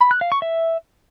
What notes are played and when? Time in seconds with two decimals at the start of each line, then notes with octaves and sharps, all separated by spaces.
0.01 B5
0.11 F#6
0.21 F5
0.32 C#6
0.42 E5